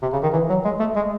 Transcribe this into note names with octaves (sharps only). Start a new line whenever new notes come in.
C3
C#3
D#3
E3
F#3
G#3
A3
G#3